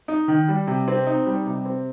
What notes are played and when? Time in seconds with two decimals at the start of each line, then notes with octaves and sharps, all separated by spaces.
0.08 D#4
0.28 D#3
0.48 G3
0.67 C3
0.88 C4
1.07 D#4
1.26 G3
1.46 C3
1.65 C4